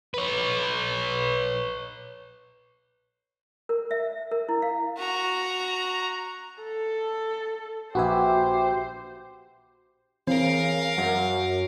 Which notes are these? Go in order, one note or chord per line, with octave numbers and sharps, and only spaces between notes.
B4 C#5
A#4
E5
A#4
E4
F5
F#4 A#5
A4
A#1 F#4 G4 B4 C5 E5 G#5
C#3 E3 C4 A#4 F5
F#2 F#4